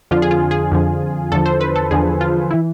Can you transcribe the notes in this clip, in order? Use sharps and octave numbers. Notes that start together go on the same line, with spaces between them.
F2 D3 F3 F4
G#4
F4
G#4
F2 D3 F3
E2 D3 F3 A4
C5
B4
A4
E2 D3 F3 G#4
F4
E3 E4